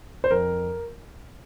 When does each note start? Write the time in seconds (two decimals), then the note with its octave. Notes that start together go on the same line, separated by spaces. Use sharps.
0.24 C5
0.30 F2 A#4